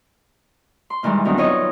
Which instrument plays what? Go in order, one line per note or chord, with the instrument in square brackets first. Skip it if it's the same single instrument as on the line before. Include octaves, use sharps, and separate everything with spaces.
[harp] C6
A#2 D#3 E3 G3 G#3
D3 D#3 F#3 B3 C4 D#4
F4 C#5 D#5